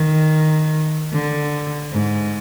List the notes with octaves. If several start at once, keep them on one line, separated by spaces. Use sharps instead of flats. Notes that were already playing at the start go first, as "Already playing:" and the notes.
Already playing: D#3
D3
G#2